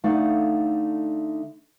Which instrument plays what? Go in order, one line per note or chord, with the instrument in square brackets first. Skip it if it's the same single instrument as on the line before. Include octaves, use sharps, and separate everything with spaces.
[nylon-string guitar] D3 A3 D#4 D5 F5 F#5